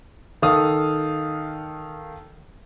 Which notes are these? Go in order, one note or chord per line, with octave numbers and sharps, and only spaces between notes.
D#3 A4 F5 D#6